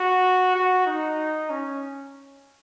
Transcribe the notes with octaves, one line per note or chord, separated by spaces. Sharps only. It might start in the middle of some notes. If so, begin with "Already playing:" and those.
Already playing: F#4
F#4
D#4
C#4